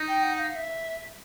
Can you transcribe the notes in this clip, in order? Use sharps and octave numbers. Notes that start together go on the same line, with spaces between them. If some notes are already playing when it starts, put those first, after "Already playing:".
Already playing: D#4
G5
F#5
F5
E5